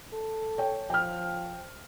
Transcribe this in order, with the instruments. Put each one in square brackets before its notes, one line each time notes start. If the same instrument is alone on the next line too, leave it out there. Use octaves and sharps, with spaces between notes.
[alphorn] A4
[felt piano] C#5 G5
[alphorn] F3 [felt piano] G5 F6